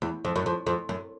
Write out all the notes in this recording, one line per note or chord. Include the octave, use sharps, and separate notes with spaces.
E2
F2
F#2
F2
F2
F#2